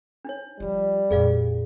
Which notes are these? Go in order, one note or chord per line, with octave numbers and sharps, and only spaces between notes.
D4 D#4 C#5
F3 G3 F4
F2 A#2 G#4 D5 F5